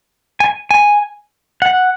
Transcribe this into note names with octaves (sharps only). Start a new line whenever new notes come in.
G#5
G#5
F#5